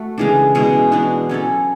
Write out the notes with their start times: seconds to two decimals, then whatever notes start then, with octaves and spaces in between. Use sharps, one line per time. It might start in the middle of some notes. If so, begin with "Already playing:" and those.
Already playing: A3 F#4
0.18 C#3 E3 G#3 D4
0.55 B2 G#3 C#4 E4
0.92 E3 G#3 D4 F#4
1.29 F#3 C#4 E4 A4